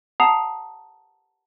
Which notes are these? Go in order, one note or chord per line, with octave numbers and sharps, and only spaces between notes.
F#5 A5 A#5 D#6 C7 F7